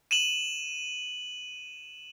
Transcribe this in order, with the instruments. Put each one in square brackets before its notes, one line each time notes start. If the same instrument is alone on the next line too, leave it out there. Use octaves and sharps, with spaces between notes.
[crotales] D#7 E7 F#7